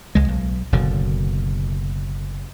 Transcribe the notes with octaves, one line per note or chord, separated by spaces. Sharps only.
C#2 G#3
B1
F#1 B2 D3